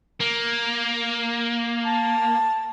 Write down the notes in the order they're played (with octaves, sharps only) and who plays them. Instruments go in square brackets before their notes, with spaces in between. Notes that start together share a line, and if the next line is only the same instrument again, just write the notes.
[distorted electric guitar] A#3
[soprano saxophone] A5